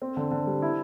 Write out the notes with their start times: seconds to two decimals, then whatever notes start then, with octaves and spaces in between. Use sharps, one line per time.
0.02 C4
0.17 D3
0.31 D3
0.47 G3
0.62 E4